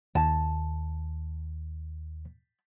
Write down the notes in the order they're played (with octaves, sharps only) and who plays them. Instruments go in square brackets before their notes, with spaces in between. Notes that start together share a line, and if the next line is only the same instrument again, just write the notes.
[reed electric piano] D#2 [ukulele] A5